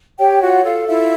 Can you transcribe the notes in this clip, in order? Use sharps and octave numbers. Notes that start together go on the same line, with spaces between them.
G4 C#5 G5
F4 F#4 F#5
F4 A4 F5
E4 F4 E5